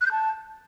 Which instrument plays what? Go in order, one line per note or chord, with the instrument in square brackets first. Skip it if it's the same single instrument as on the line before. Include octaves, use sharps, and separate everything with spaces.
[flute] F#6
G6
A5